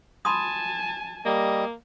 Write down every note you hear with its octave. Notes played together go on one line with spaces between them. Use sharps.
G#5 A5 B5 C6 D#6
G3 A#3 D#5